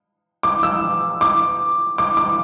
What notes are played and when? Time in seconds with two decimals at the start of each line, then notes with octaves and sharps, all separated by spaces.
0.43 D6
0.63 E6
1.21 D6
1.98 D6
2.17 D6